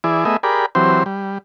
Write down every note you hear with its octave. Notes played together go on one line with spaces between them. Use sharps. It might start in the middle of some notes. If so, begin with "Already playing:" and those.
E3 E4 G#4 D5
A3 B3 G#4 D#5 E5
G4 G#4 A#4 D5 B5
E3 F#3 C4 G4 C5
G3